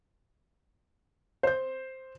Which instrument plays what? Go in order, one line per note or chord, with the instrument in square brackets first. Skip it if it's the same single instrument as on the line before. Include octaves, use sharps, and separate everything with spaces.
[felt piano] C5 G6